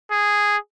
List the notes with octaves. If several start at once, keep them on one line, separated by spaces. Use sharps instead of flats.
G#4